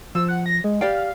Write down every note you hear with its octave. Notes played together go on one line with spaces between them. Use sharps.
F3 E6
F#5
A#6
G#3
G4 D5 F5 G5